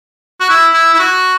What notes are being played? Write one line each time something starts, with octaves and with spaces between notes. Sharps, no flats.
F#4
E4
E4
E4
F#4